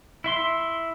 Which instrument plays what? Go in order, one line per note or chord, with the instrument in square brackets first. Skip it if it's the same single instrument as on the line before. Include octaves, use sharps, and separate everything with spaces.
[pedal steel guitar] E4 E5 C6